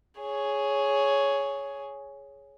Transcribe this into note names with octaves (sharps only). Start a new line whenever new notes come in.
G#4 C#5